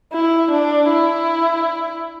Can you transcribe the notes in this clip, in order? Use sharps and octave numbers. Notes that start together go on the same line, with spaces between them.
E4
D4
E4